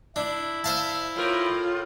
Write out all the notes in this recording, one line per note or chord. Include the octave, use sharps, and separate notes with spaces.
D4 E4
C5 E5 F5 A5
A2 F4 A#4